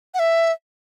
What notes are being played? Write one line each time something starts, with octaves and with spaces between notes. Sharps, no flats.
F#5
E5